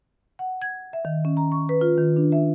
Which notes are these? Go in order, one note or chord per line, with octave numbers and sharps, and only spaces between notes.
F#5
G#6
E5
D#3
C#4
A#5
C#6
B4
F4
D#3
D4
E5